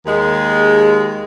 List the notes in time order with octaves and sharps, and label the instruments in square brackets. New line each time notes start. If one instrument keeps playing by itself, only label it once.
[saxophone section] D#2 G#3